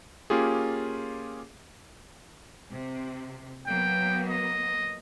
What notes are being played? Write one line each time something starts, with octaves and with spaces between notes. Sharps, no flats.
A#3 C#4 F4 G4 G#4
C3
F#3 A#3 B3 G5
D#5